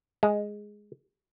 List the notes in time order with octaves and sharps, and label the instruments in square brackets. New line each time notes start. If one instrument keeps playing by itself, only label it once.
[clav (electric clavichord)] G#3